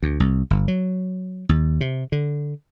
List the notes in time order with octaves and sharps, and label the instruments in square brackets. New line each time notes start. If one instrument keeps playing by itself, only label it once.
[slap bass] D2
C2
G1
F#3
D#2
C3
D3